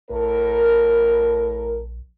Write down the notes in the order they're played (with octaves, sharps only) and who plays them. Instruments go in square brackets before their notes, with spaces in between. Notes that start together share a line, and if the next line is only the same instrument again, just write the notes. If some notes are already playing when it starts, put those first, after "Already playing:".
[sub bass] A#1 [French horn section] A2 A4 A#4